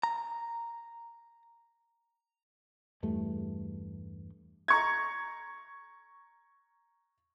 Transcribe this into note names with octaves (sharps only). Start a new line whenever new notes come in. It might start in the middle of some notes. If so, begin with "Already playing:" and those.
A#5
E2 G2 A3
A#5 C#6 G#6